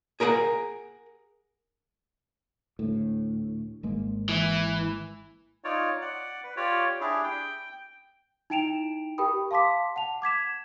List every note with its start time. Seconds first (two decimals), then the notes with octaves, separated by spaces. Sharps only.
0.20 G#4 A#4 B4 F5 F#5 A#5
2.79 D2 A2
3.83 G#1 G#3 A#3
4.29 E3
5.64 D#4 F4 C#5 D5
6.01 D5 F#5
6.43 B4
6.57 F4 G4 C#5 D5
7.01 D4 E4 G4 G#4
7.23 G5
8.50 D#4 E4 G5 D7 E7 F7
9.18 G4 A#4 G5 B5 D#6
9.51 F5 A5 C6 D6 B6
9.96 F#5 A5 F7
10.22 D6 G#6 B6 E7